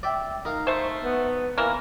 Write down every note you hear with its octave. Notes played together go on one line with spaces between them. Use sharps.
D5 E5 G5
D#4 A#4 F5
A3 C5
B3
E3 A#3 A#4